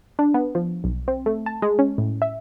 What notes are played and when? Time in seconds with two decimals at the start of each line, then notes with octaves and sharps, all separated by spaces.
0.19 D4
0.34 B3
0.55 F3
0.84 B1
1.08 C4
1.26 A3
1.46 A5
1.62 G#3
1.79 C#4
1.98 A2
2.22 E5